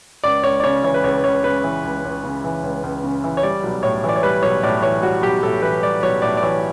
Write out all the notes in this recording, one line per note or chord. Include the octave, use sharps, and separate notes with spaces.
C#2 D5
C#2 C#5
D5
C#3 C#5
E3 C#5
B4
C#2 C#5
C#2 C#5
C#3 B4
E3
C#2
C#2
C#3
E3
C#2
C#2
C#3
E3
C#5
G3 D5
B1
A2 C#5
E3 D5
C#5
G3 B4
B1 C#5
A2 D5
E3 C#5
G3 F#4
B1 G4
A2 A4
E3 B4
G3 D5
B1 C#5
A2 D5
D5
E3 C#5